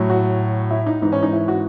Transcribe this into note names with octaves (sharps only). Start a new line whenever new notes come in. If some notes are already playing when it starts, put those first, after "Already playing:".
Already playing: A2 F#3
F#4
E4
D#4
G#2 E3 D#4
C#4
D#4
E4
F#4